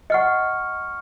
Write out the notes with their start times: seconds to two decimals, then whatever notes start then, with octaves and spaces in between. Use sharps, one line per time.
0.10 D#5 F#5 C#6 F6 C#7